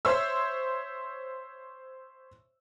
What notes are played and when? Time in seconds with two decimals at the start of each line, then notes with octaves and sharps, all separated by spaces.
0.05 C5 C#5 E5 E6